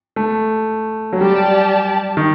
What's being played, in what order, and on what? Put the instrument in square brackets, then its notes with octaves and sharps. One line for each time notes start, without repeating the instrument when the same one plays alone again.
[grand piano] A3
F#3
[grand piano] G3 [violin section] G4 D5 A5
[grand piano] D#3